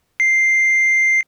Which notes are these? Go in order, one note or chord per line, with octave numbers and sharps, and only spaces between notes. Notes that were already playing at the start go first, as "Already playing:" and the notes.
C7